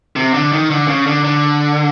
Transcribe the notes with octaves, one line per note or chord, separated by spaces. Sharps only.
C3
D3
D#3
D3
C#3
D3
D3